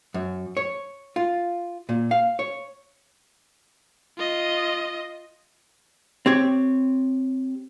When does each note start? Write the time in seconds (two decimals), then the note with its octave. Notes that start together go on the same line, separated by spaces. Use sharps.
0.14 F#2
0.57 C#5
1.16 F4
1.89 A#2
2.11 F5
2.39 C#5
4.18 F4 D#5
6.26 C4 G4 C#5